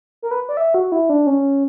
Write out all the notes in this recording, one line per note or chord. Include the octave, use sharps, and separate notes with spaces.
A#4
B4
D5
E5
F#4
E4
D4
C#4